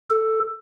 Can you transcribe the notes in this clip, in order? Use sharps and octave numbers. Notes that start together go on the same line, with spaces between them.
A4